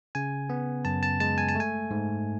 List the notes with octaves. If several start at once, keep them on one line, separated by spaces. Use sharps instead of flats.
C#3 G#5
B3
F#2 A5
A5
G#3 A5
G#5
A5
A3 G#5
G#2